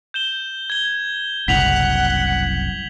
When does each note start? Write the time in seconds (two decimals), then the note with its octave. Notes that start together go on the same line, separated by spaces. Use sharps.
0.14 G6 E7 G7
0.70 G#6 G7
1.48 F#1 C2 F#5 B6 F7 F#7